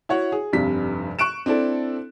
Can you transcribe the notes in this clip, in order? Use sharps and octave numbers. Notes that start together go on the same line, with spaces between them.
E4 F#4 C#5 F#5
G#4
F1 G2 C3 B6
C#6 F#6 D7 E7
C4 D4 E4 A4